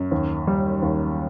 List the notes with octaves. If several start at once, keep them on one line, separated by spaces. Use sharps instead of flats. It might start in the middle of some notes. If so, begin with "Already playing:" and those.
Already playing: F#2
D#2
G3
D#2